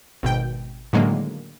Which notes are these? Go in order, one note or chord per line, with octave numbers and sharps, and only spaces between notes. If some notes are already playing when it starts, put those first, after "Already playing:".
G#1 B2 G5
A2 D3 D#3 F#3 G#3 A#3